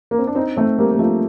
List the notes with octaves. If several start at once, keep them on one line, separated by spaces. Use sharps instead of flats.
A#3
C4
D4
C4 D#4
A3 C4
G3 A#3
A#3
F3 A3